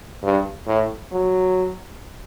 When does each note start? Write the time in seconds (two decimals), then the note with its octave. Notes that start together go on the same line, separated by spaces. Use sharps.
0.23 G2
0.67 A2
1.12 F#3